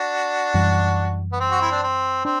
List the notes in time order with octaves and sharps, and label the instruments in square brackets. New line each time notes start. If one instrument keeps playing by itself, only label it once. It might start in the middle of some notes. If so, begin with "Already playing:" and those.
Already playing: [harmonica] D4 F#4
[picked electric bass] F#2 E3 G3
[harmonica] B3
C4
F#4
E4
D4
C4
[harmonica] C4 [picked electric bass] D4